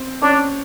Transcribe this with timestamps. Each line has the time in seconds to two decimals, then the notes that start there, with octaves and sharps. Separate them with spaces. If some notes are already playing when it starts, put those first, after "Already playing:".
Already playing: C4
0.22 C#4 D4 C#5